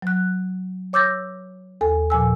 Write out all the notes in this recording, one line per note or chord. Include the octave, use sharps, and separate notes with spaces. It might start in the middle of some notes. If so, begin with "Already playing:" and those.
F#3 F#6
C#5 D6 E6 G6 A6 A#6
D#2 A4 G#5
A#2 F3 G#5 E6